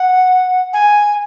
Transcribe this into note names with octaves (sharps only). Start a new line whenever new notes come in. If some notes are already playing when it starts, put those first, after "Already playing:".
Already playing: F#5
G#5